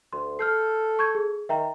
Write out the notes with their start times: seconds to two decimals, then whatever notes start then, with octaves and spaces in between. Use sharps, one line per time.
0.13 D2 C6
0.39 A4 F6 G6 C7
0.99 C#6 G6 G#6
1.15 G#4
1.49 D#3 E5 G5 A#5